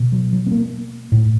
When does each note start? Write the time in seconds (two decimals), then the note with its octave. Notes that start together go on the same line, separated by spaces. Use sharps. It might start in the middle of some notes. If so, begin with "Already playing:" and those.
Already playing: B2
0.12 F#3
0.33 F#3
0.46 B3
0.52 A#3
1.12 A2